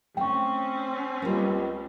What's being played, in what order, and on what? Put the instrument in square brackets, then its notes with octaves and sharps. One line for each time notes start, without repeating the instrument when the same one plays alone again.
[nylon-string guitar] A3 [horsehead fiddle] C4 C#4 [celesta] G5 C#6
[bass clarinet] C#2 [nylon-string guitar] G3 A#3